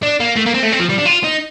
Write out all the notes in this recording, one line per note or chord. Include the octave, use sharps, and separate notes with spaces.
D4
A#3
A3
A#3
C4
A3
C4
F3
G3
D4
F4
D#4